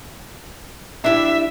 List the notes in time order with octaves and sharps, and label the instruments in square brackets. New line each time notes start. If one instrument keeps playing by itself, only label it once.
[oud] D4 E4 G4 [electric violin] E5